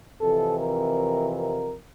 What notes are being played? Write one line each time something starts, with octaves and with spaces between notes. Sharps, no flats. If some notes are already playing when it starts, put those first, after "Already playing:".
F2 C3 E3 A4
A#4
A#4